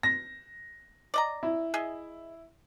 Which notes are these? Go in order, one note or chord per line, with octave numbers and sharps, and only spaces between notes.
A#6
D5 D#5 A#5
E4
G#4 D#5 E5